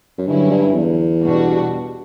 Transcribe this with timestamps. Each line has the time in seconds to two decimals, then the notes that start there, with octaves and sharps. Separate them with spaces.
0.18 F#2
0.26 G2 D3 F#3 C#4 E4
0.51 G2
0.75 E2
1.22 B2 G3 D4 F#4